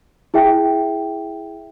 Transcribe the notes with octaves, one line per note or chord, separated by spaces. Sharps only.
E4 G#4 E5 G5